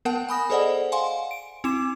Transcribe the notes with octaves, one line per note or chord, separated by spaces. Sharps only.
B3 A#4 F#5 A5
G#5 B5 D#6 A#6
G#4 A4 C5 D5 D#5 F#5
F5 F#5 G#5 C6
D7
C4 E4 D6 E7